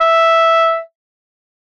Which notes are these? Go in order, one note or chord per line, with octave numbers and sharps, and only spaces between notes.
E5